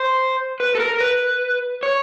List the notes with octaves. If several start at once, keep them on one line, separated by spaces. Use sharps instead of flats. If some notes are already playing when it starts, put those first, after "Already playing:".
Already playing: C5
B4
A4
A#4
B4
C#5